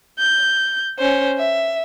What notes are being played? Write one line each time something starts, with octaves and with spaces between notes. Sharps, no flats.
G6
C#4 C5
E5